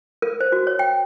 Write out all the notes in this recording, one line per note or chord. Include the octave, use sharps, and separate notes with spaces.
A#4
C5
F#4
C#5
G5